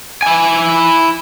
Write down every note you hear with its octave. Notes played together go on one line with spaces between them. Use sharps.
E4 G#5